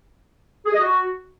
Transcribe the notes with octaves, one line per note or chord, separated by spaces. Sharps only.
G#4
D#5
F#4